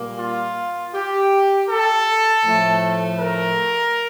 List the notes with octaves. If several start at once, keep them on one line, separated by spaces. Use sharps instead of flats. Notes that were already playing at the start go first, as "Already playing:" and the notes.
Already playing: A#2 G3 A#3
F4
G4
A4
A2 F3 A3
A#4